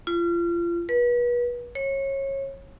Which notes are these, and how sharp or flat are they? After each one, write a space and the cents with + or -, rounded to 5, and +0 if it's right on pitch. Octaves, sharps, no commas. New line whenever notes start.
F4 -30
B4 -35
C#5 -25